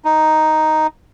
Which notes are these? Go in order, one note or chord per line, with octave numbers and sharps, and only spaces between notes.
D#4